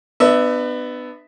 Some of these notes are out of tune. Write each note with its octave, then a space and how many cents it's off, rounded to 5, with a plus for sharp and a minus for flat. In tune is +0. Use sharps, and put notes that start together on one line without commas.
B3 +15 D4 +40 E5 +0